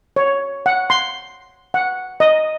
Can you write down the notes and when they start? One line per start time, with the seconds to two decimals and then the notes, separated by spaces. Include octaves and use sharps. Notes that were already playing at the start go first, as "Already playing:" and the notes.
0.16 C#5
0.66 F#5
0.90 C6
1.74 F#5
2.20 D#5